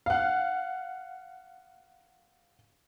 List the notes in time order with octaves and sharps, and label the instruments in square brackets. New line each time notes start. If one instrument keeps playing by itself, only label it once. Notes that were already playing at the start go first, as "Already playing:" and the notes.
[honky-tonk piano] F5 F#5